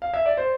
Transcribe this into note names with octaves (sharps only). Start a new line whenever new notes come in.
F5
E5
D5
C5